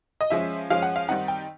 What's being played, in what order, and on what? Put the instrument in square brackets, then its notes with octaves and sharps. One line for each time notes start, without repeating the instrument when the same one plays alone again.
[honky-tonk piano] D#5
F3 G#3 C#4 E5
F3 G#3 C#4 F5
F#5
F5
D#3 G3 C4 D#4 F#5
G5